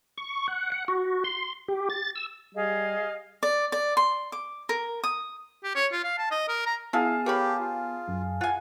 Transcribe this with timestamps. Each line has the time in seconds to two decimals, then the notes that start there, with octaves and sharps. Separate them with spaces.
0.18 C#6
0.48 F#5
0.72 F#5
0.88 F#4
1.24 C6
1.68 G4
1.90 A6
2.16 E6
2.55 G3 G#4 D#5 F5
3.43 D5
3.72 D5
3.97 C6
4.32 D6
4.69 A#4
5.04 D#6
5.64 G4
5.75 C#5
5.92 F4
6.04 F5
6.18 A5
6.31 D#5
6.48 A#4
6.66 A#5
6.93 B3 E4 G#4 F5 A5
7.26 G4 A#4 C#5 B5
7.59 F4
8.08 F#2
8.41 F4 F#5 G#5